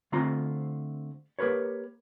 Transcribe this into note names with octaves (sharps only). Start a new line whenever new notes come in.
D3 A3 C4 F4 A#5
A#3 G4 A#4 B4 C#5